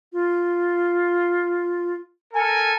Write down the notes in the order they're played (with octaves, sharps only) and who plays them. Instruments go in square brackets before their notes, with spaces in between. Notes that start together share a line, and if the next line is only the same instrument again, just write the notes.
[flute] F4
[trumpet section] A4 A#4 G#5